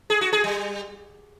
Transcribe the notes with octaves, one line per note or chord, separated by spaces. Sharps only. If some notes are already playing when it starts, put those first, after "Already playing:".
G#4
F#4
G#4
G3